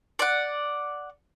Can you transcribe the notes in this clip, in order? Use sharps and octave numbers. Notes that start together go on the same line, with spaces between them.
D5 F#5